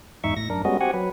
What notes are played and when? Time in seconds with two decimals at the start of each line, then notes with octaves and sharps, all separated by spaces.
0.24 E2 G#2 D#4 E5 C#6
0.37 A2 A#6
0.50 F#2 D4 A#4
0.65 G3 G#3 B3 C#4 F#4 D#5
0.81 C4 F#4 G4 F#5 G#5
0.94 F#3 B4